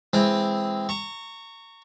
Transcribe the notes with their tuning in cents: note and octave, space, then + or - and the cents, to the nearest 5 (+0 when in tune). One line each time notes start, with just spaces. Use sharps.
E3 +0 G#3 -15 C4 +0
A#5 -30 C#6 +0